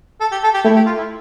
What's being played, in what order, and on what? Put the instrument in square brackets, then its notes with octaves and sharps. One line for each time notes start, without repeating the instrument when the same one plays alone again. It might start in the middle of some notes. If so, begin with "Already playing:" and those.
[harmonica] A4
G4
A4
G4
[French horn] A3 [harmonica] E4
[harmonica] G4
F4
E4